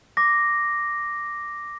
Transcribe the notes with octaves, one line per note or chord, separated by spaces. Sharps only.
D6 A#6